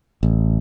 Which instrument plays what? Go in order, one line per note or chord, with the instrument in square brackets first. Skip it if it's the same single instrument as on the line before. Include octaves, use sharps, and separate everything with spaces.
[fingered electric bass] A1